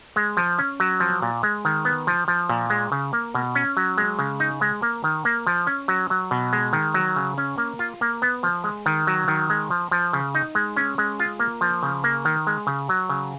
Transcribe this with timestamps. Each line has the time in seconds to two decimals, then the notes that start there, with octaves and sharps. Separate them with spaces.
0.16 G#3
0.37 F3
0.59 C#4
0.80 F#3
1.00 F3
1.22 A#2
1.43 G#3
1.65 D#3
1.85 B3
2.07 F3
2.28 F3
2.49 A#2
2.70 G#3
2.92 C#3
3.13 A#3
3.35 B2
3.55 C#4
3.77 F#3
3.98 G#3
4.19 C#3
4.40 D#4
4.61 G#3
4.82 A#3
5.04 D#3
5.25 A#3
5.47 F3
5.67 C#4
5.88 F#3
6.10 F#3
6.31 B2
6.53 G#3
6.73 D#3
6.94 F#3
7.16 C#3
7.38 C#4
7.58 A#3
7.79 F4
8.01 A#3
8.22 B3
8.43 F3
8.64 G#3
8.86 D#3
9.07 F#3
9.28 D#3
9.50 G#3
9.70 F3
9.91 F3
10.13 C#3
10.35 D#4
10.55 G#3
10.76 C#4
10.98 G#3
11.19 F4
11.40 A#3
11.61 F3
11.83 C#3
12.04 A#3
12.25 D#3
12.47 G#3
12.67 C#3
12.89 F#3
13.09 C#3